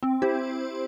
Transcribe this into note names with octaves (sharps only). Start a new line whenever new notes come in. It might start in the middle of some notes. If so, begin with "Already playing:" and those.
C4
E4 G4 C5